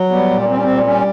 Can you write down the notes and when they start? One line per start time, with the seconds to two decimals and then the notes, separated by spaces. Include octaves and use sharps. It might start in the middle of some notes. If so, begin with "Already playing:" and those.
Already playing: F#3
0.11 G3 B3
0.31 A#2
0.49 G3 C4
0.56 C#4
0.63 C4
0.68 A#2
0.86 G3 C#4